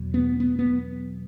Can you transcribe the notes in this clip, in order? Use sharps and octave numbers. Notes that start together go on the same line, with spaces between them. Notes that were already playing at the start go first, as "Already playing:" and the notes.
Already playing: E2 B2 F#3
B3
B3
B3